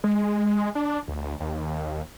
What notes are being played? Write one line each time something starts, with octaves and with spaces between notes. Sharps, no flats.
G#3
D4
D2
D#2